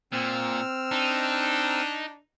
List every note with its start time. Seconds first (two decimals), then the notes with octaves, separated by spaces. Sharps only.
0.13 A#2 C4 E6 F6
0.91 D4 D#4